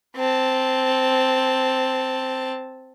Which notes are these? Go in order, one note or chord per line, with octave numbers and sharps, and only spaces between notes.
C4 A5